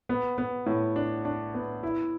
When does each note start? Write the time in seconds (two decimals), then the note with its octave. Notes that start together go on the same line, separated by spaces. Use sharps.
0.09 B3
0.38 B3
0.66 A2
0.96 D4
1.25 D4
1.54 B3
1.83 E4